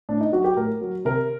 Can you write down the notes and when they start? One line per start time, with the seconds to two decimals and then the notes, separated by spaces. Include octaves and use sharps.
0.09 A2 D4
0.21 D#4
0.32 F#3 F#4
0.44 G4
0.57 A2 A#4
0.81 F#3
1.05 C3 A#4